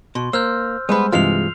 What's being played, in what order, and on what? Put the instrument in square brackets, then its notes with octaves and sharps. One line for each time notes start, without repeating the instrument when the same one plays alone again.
[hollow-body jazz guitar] B2 [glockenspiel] C6
[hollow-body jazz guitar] A#3 [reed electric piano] C5 [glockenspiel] E6 F6 G6
[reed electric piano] G3 G#3 C5 [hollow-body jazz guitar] B3 B4
[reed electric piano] G2 E3 F4 [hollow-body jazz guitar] C3 G#3 [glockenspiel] F6 C7 F7